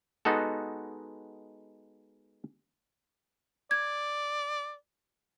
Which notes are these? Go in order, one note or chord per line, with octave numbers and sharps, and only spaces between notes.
G#3 B3 D#4 F#4 A4
D5 G#6